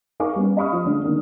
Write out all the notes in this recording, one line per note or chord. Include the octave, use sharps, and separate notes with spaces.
D#4 A#4 F5 G#5 C#6 D6
G3 B3 C#4
D#5 F5 B5 C#6 D#6 F6
F3
D3 G#3 A3 C#4 D4
D3 D#3 A#3 D4